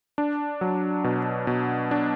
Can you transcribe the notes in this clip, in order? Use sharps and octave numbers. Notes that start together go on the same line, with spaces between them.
D4
F#3
B2
B2
D4